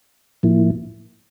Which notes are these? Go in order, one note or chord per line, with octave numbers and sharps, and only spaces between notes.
A2 F3 A#3 E4